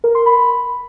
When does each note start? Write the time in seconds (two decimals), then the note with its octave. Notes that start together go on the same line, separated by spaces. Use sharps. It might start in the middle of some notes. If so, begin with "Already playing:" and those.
0.04 A#4
0.15 C6
0.26 B5